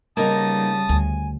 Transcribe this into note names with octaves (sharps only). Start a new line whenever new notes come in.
C#3 G3 A#3 B3 D#4 A5 D#6
D2 G#5